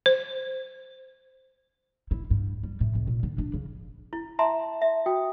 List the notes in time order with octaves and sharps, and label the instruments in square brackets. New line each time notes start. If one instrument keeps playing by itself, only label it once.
[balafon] C5
[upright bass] E4
G2
G3
A2
C#2
A#2
D3
D4
C#3
[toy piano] E4
[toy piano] E5 A#5 C6 [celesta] A5
[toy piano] E5
[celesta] F#4 G5 D#6